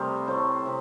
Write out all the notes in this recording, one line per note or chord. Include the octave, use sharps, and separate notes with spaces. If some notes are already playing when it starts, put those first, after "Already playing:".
Already playing: C3 G3 A3 A#4 C5 D#5
A2 A3 C5
C3